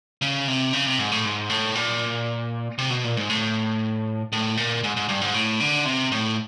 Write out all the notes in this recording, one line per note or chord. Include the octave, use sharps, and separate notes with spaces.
C#3
C3
C#3
C3
G#2
A2
G#2
A2
A#2
C3
B2
A#2
G#2
A2
A2
A#2
G#2
G#2
G2
G#2
A2
D3
C3
A2